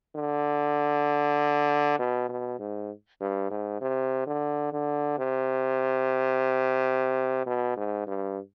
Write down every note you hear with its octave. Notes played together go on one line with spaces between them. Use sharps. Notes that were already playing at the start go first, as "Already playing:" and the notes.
D3
B2
B2
G#2
G2
G#2
C3
D3
D3
C3
B2
G#2
G2